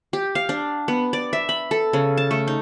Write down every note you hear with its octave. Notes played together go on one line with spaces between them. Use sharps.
G4
F5
D4
B3
D5
E5
B5
A4
C#3
A5
A3
D#4